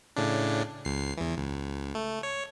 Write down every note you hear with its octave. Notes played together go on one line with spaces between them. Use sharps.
A2 C#3 D4
C#2 C7
E2 E3
C#2
A3
C#5